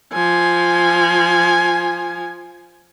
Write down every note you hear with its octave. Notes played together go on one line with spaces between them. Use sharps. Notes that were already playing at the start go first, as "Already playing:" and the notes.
F3 G#5